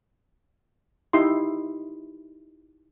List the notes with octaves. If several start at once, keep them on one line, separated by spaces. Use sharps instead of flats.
D#4 E4 G4 C6